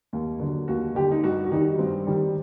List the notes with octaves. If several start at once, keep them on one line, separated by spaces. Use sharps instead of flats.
D#2
D3 F#3
D#2 F#4
D3 F#3 G4
D#4
G2 F#4
F#4
D#3 G3 D#4
G2 C4
D#3 G3